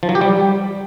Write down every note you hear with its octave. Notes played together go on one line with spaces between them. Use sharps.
F3
F#3
G4
G3